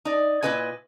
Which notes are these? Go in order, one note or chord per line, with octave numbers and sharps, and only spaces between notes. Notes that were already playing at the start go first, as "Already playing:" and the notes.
D#4 D5
A#2 C#4 E4 B4 D#5 G#5